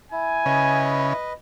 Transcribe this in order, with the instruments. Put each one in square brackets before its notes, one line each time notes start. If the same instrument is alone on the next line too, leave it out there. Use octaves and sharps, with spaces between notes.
[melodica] E4 [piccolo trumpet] G#5
[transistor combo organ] C#3 [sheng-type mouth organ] B4 D#5